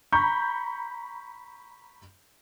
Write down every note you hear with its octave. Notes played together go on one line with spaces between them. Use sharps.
A#5 B5 C#6 G6